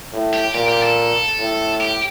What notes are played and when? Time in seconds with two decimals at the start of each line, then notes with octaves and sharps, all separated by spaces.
0.13 A2
0.34 G4
0.55 A#2 G4
0.68 G4
0.83 A4
1.39 A2
1.81 G4